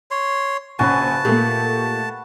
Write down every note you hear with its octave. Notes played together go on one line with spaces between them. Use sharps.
C#5 C6
A#1 C#3 C#4 F#4 B4 G#5 A5
A#2 A3 G4